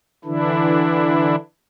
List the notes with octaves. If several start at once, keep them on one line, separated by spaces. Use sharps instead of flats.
D3 E3 D4 E4